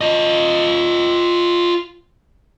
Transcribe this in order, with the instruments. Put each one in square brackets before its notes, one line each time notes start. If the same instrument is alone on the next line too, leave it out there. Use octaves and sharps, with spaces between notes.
[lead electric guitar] F4 D#5